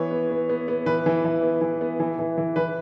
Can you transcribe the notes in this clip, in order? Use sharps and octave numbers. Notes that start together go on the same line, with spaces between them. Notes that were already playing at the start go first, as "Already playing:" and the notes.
Already playing: E3 B3 C#5
B3
B3
B3
B3
E3 B4
E3
E3
B3
E3
B3
E3
E3
E3
E3 B4